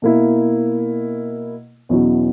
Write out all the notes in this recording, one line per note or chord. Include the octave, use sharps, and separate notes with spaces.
B2 A#3 E4
E2 B2 F#3 C#4 E4